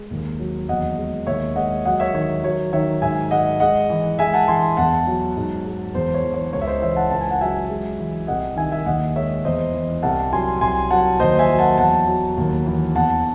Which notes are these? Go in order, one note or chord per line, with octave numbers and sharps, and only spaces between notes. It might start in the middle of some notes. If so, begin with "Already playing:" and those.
Already playing: G#3
D#2
F#3
E2 D#5 F#5
G#3
D#2 C#5 E5
G#3 D#5 F#5
F#3 D#5 F#5
C#5 E5
D#3 C#5
F#3 C#5
D#3 C#5 E5
G#2 E5 G#5
G#3 D#5 F#5
G#3 D#5 F#5
E3
G#3 E5 G#5
F#5 A5
E3 G#5 C6
E2 F#5 A5
F#3
G#2
G#3
E2 C5
C#5
E3
C#5
C#2 C#5
E5
C5 D#5
E3 C#5 E5
F#5 A5
C#2 A5
G#5
F#5
F#3 E5 G#5
G#3
E3
C2 D#5 F#5
D#3 E5 G#5
E5 G#5
D#2 D#5 F#5
G#3 C#5 E5
E2 C5 D#5
E3
C2 F#5 A5
F#3 G#5 C6
C2 G#5 C6
F#3 F#5 A5
D#2 C5 D#5
E5 G#5
F#3
F#5 A5
E2 F#5 A5
F#3
D#2
E3
E2 F#5 A5